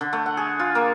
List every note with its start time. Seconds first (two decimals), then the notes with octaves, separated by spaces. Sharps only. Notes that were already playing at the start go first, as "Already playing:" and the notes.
0.01 D3
0.13 A3
0.26 F#5
0.37 G#4
0.59 F4
0.75 A#3